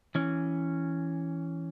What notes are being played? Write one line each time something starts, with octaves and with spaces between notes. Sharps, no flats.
E3 C#4